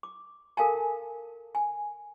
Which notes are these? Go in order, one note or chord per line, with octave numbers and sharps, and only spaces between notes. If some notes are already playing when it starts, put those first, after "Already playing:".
D6
A4 A#4 F5 G#5 A5
G#5